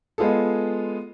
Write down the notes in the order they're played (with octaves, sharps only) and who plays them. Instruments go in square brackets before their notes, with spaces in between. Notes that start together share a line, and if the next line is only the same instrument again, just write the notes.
[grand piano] G#3 B3 F4 G#4 A4